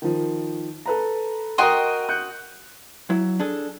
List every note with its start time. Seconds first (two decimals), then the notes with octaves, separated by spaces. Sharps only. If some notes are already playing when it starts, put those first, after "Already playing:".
0.02 D#3 F3
0.86 A4 B4 A#5
1.58 F#4 A#4 D#5 G5 A#5 C6
2.09 F#6 G6 C#7
3.10 F#3 E4
3.40 D4 G#4 A4